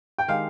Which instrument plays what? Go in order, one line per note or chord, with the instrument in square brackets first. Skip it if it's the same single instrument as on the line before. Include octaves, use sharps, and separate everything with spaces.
[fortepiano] G5
[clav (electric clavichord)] D#3 G#3 D4 G4 [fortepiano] F5